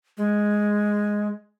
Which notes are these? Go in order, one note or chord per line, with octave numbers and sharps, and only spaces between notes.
G#3